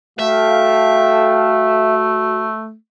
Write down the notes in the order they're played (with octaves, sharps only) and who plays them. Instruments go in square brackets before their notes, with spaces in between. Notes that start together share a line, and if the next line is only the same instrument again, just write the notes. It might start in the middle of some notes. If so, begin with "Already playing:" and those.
[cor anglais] A3 [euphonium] F#4 [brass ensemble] A4 F5 G5 [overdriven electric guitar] E5